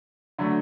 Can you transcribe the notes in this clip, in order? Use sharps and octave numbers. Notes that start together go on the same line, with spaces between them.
D3 F#3 A3